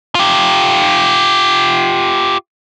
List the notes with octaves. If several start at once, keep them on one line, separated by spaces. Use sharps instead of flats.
F4 G4